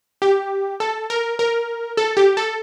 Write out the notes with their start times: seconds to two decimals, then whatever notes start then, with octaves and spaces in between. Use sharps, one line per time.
0.22 G4
0.80 A4
1.10 A#4
1.39 A#4
1.97 A4
2.17 G4
2.37 A4